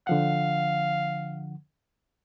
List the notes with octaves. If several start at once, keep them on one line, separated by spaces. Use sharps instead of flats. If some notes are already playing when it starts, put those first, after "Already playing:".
D3 F3 F5 F#5